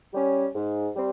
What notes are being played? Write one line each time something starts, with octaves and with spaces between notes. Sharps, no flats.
G3 C#4
G#2
G3 C4